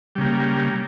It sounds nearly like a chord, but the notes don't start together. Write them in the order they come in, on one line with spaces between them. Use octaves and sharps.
G3 C#3 A#3